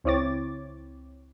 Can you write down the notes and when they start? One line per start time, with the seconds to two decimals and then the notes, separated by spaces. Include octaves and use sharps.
0.04 C#2 C4 E4 C#5 D6 A6